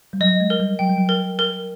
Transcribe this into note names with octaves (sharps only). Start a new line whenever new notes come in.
G3
F#3 D#5
G#3
A#4
G3
F#3 G5
G3
F#3
A#4
A#4